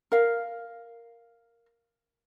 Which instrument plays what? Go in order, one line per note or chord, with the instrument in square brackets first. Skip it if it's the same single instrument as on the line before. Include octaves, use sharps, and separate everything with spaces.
[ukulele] A#4 F5